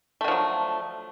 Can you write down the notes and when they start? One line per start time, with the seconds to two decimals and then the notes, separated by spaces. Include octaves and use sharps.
0.21 A3
0.24 D3
0.28 F3
0.32 F#3